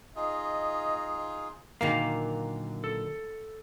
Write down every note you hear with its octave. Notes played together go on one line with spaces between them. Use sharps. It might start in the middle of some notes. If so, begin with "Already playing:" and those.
D#4 F4 G#4 D#5
A#2 D3 D#3 F#3 A#3 F5 A#5
A4